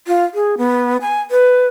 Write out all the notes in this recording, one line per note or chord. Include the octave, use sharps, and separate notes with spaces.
F4
G#4
B3
G#5
B4